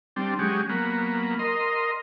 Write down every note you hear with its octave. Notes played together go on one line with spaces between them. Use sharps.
G3 C4 D4
F#3 G#3 C#4 G4
F#3 A#3 B3
A#4 D#5 C6